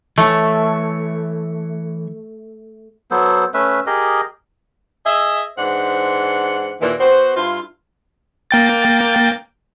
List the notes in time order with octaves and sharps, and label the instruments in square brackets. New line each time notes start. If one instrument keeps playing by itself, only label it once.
[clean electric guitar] E3 C#5 [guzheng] A3
[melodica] F#3 B3 A4 C5
A3 C#4 B4 E5
G4 G#4 A#4 D#5
[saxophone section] G#4 D#5 E5
G#2 E3 D4 C5 F#5
D#2 A#2 E3
B3 F#4 C5
G2 E4 F4
[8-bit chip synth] A#3 G5 A6